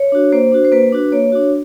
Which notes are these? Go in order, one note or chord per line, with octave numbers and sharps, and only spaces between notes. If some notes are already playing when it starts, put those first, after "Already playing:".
Already playing: C#5
D4 F#4
A#3 C5
D4 F#4
C5
A#3 B4
D4 F#4
A#3 C#5
D4 F#4